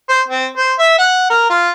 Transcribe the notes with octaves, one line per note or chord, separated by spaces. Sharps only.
C5
C4
C5
E5
F#5
A#4
F4